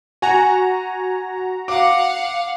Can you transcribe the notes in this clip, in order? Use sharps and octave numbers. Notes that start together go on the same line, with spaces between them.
F#4 G#5 A#5
F5 F#5 D6